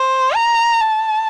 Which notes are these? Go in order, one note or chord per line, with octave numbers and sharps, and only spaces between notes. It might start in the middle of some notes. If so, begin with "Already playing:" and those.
Already playing: C5
A#5
A5